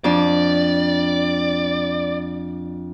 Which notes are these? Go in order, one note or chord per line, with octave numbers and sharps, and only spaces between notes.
F2 D4 D5